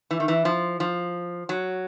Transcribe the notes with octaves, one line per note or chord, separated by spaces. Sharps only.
E3
D#3
E3
F3
F3
F#3